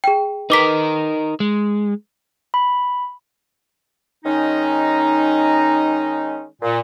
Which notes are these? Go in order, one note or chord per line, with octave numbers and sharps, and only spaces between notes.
G#4 G5
D#4 A#4 B4 D6 B6
G#3
B5
D#3 G#3 C#4 D#4
A#2